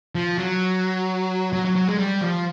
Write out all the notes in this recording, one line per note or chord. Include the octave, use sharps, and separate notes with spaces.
F3
F#3
F#3
F#3
F#3
G#3
G3
F3